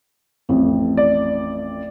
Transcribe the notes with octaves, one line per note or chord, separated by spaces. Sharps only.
A1 F2
D5